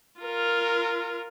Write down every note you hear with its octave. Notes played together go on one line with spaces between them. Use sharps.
F4 A#4